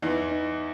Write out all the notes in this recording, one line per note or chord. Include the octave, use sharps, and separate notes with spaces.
E2 E3 D#4
D#4